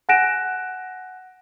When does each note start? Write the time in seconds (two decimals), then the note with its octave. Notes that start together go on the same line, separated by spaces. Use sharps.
0.09 F#5 G#5 F#6 A#6 D7 E7